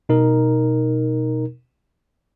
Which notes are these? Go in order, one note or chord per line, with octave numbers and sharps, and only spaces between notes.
B2 D#4 A#4